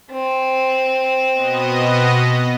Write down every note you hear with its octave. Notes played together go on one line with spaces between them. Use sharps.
C4
B2 B3 D#5